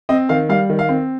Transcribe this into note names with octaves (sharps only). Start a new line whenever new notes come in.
C4 D#5
D#3 F5
G3 F5
D#3
F5
C4